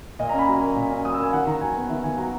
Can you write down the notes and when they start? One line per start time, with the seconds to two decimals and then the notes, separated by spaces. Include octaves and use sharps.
0.19 A#2 D#5
0.29 C#4 A#5
0.39 B5
0.48 F#3
0.62 A#3
0.76 A#2
0.91 C#4
1.04 F#3 D#6
1.14 E6
1.19 A#3 G#5
1.33 D#3 F#5
1.47 D#3 A#5
1.61 F#3 G#5
1.76 B3
1.90 D#3 E5
2.04 D#3 G#5
2.18 F#3 A#5